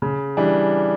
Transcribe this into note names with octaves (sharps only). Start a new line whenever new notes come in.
C#3
E3 G3 D4